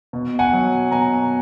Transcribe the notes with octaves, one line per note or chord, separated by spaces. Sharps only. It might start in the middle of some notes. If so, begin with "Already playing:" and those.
B2
F#5 G#5
F#3
B2 G#5 A#5